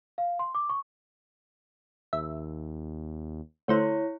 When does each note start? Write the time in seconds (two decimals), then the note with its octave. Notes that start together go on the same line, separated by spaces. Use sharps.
0.18 F5
0.39 C6
0.55 D6
0.69 C#6
2.13 D#2 E5
3.68 D2 A3 E4 C5 C#5